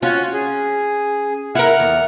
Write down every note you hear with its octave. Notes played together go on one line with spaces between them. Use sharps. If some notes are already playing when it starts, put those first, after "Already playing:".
C#4 F4 F#4
G#4
E4 A#4 F#5 F6
E2